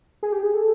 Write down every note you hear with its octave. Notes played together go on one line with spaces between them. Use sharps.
G#4
G4
G#4
A4